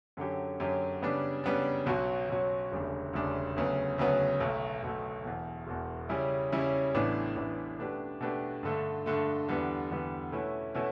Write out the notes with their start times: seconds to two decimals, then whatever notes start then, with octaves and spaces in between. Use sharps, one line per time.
0.17 F#2 D3 F#3 C#4 G4
0.60 F#2 D3 F#3 C#4 G4
1.02 C#3 G3 B3 D4
1.44 C#3 G3 B3 D4
1.86 B1 B2 F#3 C#4 F#4
2.30 B1 B2 F#3 C#4 F#4
2.72 E1 D2 C#3 G3 D4
3.13 E1 D2 C#3 G3 D4
3.56 D2 C#3 F#3 B3
3.98 D2 C#3 F#3 B3
4.40 B1 B2 A3
4.83 B1 B2 A3
5.25 E1 E2 B2
5.67 E1 E2 B2
6.09 C#3 G3 C#4 E4
6.52 C#3 G3 C#4 E4
6.94 A1 A2 E3 B3 D4
7.36 A1 A2 E3 B3 D4
7.79 B2 A3 D4 G4 B4
8.21 B2 A3 D4 G4 B4
8.63 G2 D3 A3
9.06 G2 D3 A3
9.48 E2 D3 G3 B3
9.91 E2 D3 G3 B3
10.32 B2 A3 C#4 E4 B4
10.74 B2 A3 C#4 E4 B4